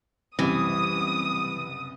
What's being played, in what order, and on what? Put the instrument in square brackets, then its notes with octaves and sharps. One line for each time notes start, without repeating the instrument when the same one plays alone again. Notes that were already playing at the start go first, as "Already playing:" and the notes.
[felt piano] F#1 C2 [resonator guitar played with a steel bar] E3 [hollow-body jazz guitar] G3 C4 [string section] D#6